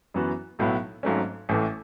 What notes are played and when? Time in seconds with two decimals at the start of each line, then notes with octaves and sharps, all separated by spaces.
0.14 F#2 E3 B3 F#4
0.59 B1 A2 F#3 B3 E4
1.03 G#1 G#2 F#3 A3 C#4
1.49 A1 A2 E3 A3